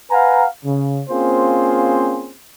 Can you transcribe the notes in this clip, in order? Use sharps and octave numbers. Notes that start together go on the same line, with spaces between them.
B4 F5 F#5 G#5 A#5
C#3
A#3 C4 C#4 F4 G#4 C5